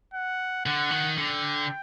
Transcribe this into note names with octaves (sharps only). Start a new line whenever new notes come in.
F#5
D3 F#5
D#3
D3 G5